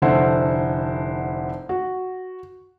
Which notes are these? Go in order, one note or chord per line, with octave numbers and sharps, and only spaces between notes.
F1 D3 E4 C5 F#5
F#4